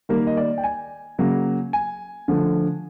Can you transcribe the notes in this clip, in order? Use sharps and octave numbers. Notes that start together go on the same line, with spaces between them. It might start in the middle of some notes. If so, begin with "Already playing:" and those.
D#3 G3 A#3 A#4
D#5
D5
G5
G#5
C#3 F#3 A#3
G#5
D3 F3 A3